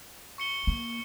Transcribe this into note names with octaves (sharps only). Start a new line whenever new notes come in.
C#6 C#7 G7
A#3